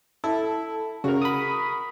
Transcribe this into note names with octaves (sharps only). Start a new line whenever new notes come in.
E4 A4
C#3 F#4 A#4
B5 D#6